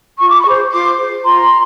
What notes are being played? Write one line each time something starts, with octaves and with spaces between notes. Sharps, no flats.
F4 C#6
D6
B5 C#6
G#4 C5
F4 C6 D6
G#4 C5
F4 A#5 C6